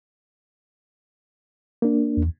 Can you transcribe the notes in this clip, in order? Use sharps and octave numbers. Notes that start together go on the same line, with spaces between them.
A#3 D4
E2